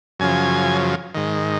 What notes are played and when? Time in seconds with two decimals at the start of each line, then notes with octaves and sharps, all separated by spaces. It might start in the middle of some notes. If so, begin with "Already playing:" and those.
0.20 F#2 C#3 F3 G#5
1.15 G#2 D#3